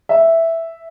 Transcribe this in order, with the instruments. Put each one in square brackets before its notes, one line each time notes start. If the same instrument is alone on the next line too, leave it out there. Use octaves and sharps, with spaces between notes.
[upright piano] E5